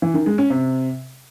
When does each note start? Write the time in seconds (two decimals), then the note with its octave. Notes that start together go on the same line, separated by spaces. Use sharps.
0.02 E3
0.14 D#3
0.26 G#3
0.38 C#4
0.50 C3